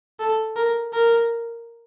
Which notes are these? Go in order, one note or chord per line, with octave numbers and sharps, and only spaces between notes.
A4
A#4
A#4